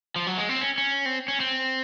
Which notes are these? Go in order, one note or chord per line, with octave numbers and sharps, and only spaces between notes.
F3
F#3
G#3
C4
C#4
C#4
C4
C#4
C4